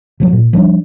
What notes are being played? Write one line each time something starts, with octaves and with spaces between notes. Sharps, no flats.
C3 F3 F#3
A#2
F3 G3 B3 D4